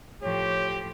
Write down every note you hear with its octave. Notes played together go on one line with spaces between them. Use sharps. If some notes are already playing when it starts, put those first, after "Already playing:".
A2 F3 G4 C#5